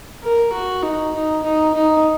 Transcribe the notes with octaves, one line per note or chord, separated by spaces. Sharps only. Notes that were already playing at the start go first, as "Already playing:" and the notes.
A#4
F#4
D#4
D#4
D#4
D#4